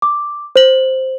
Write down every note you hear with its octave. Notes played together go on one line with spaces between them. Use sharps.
D6
C5 F#7